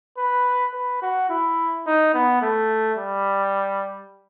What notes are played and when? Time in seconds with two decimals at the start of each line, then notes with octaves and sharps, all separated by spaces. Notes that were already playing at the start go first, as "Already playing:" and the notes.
0.18 B4
0.74 B4
1.02 F#4
1.30 E4
1.86 D#4
2.14 B3
2.42 A3
2.98 G3